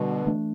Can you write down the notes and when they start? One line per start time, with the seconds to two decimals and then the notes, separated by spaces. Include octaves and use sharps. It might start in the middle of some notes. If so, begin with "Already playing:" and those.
Already playing: B2 D3 G3
0.27 E3 A3 D4